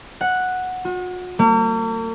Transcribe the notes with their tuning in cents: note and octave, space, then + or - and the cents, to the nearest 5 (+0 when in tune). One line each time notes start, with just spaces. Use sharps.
F#5 -5
F#4 -45
A#3 -45